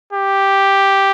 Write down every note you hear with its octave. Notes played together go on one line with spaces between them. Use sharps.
G4